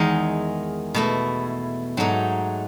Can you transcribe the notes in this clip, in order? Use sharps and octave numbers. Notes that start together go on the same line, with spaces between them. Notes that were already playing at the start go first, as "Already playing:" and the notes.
Already playing: E2 D#3 G#3 D#4
B2 A3 E4
G#2 F#3 A3 D#4